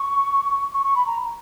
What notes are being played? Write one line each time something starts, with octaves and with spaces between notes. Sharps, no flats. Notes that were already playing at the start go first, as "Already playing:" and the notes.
Already playing: C#6
C#6
C#6
B5
A#5